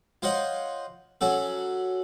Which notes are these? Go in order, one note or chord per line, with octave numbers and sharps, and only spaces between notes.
F4 C5 C#5 D#5 F#5
F#3 C#4 F#4 A4